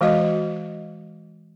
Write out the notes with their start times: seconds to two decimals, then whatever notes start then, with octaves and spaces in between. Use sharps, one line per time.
0.01 E3 G#3 F#4 D#5